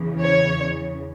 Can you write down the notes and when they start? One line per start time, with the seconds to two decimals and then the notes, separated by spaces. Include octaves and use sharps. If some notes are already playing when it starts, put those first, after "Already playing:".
Already playing: E2 C#3 E3
0.20 C#5